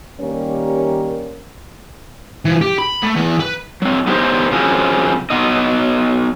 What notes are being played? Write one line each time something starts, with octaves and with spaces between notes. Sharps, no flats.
D#3 G3 A#3 C#4 G4 A#4
E3 F3
G4
B5
A3
E3 B3
B4
F#3 C4
B3 D#4 G4 G#4 C5 C#5
C#3 F3 F#3 C4 C#4
F#3 B3 D#4 D#5